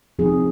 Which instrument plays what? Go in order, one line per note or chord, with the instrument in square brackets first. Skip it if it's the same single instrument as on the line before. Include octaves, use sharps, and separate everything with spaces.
[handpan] F3 C4 D#4 G#4